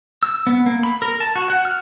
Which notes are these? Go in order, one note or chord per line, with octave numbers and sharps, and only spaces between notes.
E6
B3
A#3
B5
A#4
A5
F#4
F#5
F6